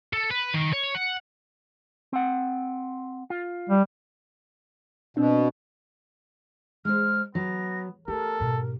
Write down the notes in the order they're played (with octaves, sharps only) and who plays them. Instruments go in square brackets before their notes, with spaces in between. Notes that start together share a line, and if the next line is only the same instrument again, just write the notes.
[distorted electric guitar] A4
B4
D#3
C#5
F#5
[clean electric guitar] C4 F#5
F4
[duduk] G3
[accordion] B2 [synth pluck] C4 D4
[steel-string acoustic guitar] G#3 C5 [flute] F6
[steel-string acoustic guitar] F#3 [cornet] B3 [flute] A#6
[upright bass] A3 [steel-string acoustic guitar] G4 [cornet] A4 [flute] A#4
[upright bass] G#2 B2